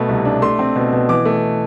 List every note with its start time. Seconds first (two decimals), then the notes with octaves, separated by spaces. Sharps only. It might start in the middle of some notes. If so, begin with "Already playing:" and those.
Already playing: B2 A3 B5
0.09 C2
0.25 D4
0.42 A3 C6
0.59 C4
0.76 B2
0.93 B2
1.09 E3 D6
1.25 A3